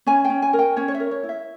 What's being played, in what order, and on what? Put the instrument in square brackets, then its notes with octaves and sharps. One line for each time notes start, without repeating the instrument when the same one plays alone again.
[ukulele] C#4 G#5
G5
C#4
G#5
A#4
G5
C#4 C#5
C#5
E5
A#4
C#5
E4
E5